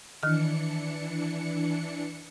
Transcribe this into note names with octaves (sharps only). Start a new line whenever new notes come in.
D#3 E3 D4 F6 C#7